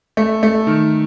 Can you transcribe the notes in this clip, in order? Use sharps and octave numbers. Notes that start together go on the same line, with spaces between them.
A3
A3
D#3